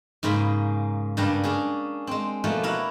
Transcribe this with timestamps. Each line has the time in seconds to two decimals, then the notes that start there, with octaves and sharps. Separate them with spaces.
0.23 G#2 C#3 A#3 G#4 B5
1.17 G2 C#3 G3 A#3 D4 A#5
1.44 C#4 D4 G#4
2.07 G#3 C4
2.44 B2 F3 A3 A#3
2.63 E4 A#4 C#5 F5 F#5